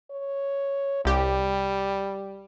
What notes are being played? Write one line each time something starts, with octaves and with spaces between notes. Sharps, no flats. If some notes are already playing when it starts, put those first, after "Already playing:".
C#5
C2 G3 G4